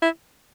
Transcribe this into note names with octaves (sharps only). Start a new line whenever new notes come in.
E4